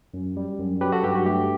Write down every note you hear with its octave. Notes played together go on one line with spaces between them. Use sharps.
F#2
G3
F#2
F#3 G4 B4
F#4 A4
G2 G4
F#4
A3 G4